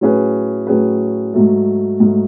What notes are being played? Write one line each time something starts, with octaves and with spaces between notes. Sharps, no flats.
A2 F#3 C#4 G#4 B4
A2 F#3 C#4 G#4 B4
G#2 F#3 A3
G#2 F#3 A3